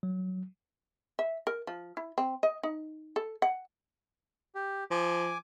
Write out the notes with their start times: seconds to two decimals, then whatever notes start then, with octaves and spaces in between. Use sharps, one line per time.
0.03 F#3
1.19 E5
1.47 A#4
1.67 F3
1.97 E4
2.18 C4
2.43 D#5
2.63 D#4
3.16 A4
3.42 F#5
4.55 G4
4.91 F3 G#5 D6